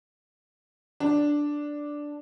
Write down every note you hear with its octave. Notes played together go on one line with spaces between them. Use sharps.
D4